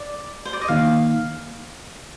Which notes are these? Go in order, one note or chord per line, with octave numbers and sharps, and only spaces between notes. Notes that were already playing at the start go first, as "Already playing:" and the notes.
Already playing: D5
C5
D5
D#5
D#3 A#3 D#4 F5